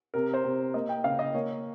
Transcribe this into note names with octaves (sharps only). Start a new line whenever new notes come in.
C3 A#4
C5
C3
A#3 D#5
G5
C#3 F5
D#5
A#3 C#5